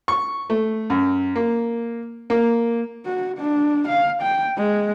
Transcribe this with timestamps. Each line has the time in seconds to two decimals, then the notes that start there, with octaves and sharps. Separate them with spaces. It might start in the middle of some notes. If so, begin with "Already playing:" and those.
0.08 C#6
0.50 A3
0.90 F#2
1.36 A#3
2.30 A#3
3.05 F#4
3.38 D4
3.88 F5
4.22 G5
4.57 G#3